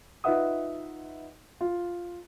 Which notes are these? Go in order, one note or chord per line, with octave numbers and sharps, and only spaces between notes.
D#4 F4 B4 E5 F#5 D#6
F4